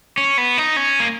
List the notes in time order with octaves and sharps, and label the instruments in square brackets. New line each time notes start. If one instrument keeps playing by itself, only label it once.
[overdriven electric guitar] C#4
B3
D#4
C#4
A#3